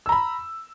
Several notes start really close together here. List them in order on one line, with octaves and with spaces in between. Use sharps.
E6 A#5 B5